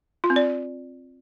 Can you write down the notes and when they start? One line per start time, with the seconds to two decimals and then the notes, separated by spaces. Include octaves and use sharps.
0.24 F4
0.30 C4
0.36 D5